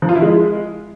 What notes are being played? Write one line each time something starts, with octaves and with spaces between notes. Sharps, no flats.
F3
F4
E4
G#3